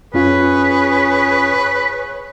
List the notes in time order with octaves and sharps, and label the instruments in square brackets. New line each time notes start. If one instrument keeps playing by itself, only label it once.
[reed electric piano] F#2 C#4 F4 [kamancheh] G#4 C#5 [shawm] B4